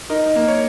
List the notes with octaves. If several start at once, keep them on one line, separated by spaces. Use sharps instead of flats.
D#4 A#4
A#3
C#5